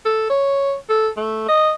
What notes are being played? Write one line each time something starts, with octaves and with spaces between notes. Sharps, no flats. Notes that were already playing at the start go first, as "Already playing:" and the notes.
A4
C#5
A4
A3
D#5